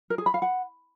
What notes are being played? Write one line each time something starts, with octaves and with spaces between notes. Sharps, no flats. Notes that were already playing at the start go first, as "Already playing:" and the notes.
A#4
G#4
B5
F5
F#5